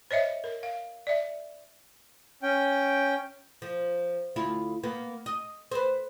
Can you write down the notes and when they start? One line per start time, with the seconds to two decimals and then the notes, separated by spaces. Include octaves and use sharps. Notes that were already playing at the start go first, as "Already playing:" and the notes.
0.11 C5 C#5 D#5 E5
0.44 A#4
0.63 F5
1.07 D5 E5
2.43 C#4 G5
3.62 F3
4.36 D2 E4 F4
4.83 A#3 B3
5.26 D#5
5.71 B4 C5